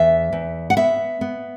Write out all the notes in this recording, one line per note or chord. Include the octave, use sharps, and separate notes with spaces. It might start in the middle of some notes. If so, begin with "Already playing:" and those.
Already playing: E2 E5
E2
F#5
B3 E5
B3